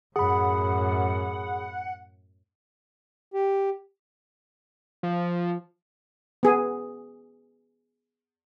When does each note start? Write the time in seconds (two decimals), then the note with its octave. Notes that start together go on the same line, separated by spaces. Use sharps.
0.16 F#2 A2 G#4 F#5 B5
3.34 G4
5.03 F3
6.43 B3 G#4